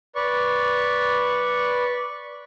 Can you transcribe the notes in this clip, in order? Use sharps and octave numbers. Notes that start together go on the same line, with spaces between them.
B4 D5 C#6